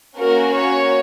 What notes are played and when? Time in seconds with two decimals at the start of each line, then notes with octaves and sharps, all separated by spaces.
0.19 A#3 C#4 F#4 A#4
0.56 C#5